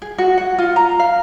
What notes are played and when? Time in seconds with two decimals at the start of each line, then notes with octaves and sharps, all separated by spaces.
0.02 G#4
0.18 F#4
0.38 F#5
0.58 F4
0.76 A#5
1.00 F5